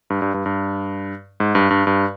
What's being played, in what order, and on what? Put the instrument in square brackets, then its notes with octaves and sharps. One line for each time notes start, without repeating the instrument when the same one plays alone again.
[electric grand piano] G2
G2
G2
G2
G#2
G2
G2
G2